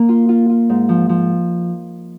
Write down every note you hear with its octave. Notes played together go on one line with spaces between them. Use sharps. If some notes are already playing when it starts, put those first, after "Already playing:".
Already playing: A#3
F4
F4
F4
G#2
F3
F3